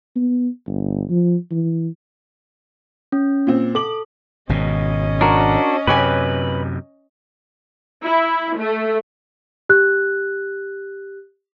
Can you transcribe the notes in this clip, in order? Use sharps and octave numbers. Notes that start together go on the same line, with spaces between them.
B3
G1
F3
E3
C#4
A#2 C4
A4 D6 F#7
G#1 B2 C#4 D#5
D4 F#4 A#4
F#2 C3 G4 B4 C#5 G#5
E4
A3
G4 F#6